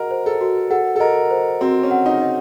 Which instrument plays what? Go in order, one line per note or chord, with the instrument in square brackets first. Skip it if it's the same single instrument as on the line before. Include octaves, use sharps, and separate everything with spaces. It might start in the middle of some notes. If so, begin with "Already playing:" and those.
Already playing: [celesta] F#4 D#5 F#5 [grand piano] A#4
[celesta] C5
[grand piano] A4
[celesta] F#4
[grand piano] A4 [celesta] F#5
[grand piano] A4
[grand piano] A#4 [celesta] D#5
[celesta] C5
[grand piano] C4 [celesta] F#4
[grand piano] C#4
[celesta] F#5
[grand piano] D#4
[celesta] D#5